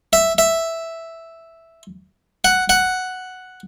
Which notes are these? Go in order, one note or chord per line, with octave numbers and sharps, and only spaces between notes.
E5
E5
F#5
F#5